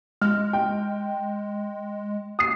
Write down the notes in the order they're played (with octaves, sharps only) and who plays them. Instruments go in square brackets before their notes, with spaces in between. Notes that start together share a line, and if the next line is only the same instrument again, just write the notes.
[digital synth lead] G#3 [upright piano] F6
[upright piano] G5
D#6 C7